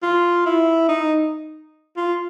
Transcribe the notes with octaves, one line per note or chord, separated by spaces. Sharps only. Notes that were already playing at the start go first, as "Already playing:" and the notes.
F4
E4
D#4
F4